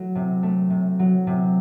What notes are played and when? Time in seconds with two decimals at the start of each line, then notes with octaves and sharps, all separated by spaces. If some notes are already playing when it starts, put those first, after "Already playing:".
Already playing: F#3 A3
0.15 C3
0.43 A3
0.70 C3
0.99 F#3
1.27 C3